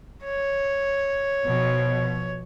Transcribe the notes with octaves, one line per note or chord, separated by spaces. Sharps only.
C#5
B2 F3